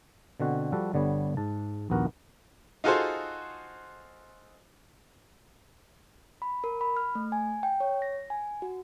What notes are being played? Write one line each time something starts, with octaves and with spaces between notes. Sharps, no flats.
B2 D3 C4 F#4
F3 G3 F#4 A4
G1 D3 G3 B3 C#5
G#2 A5
A#1 D#2 B3 F#4 A#4
D#4 F4 F#4 G#4 A4 C5
B5
A#4
B5
F6
A3
G#5
G5
C#5
A#6
G#5
F#4